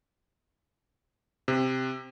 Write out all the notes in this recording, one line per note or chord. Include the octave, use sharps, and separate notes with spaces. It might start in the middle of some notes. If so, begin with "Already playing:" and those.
C3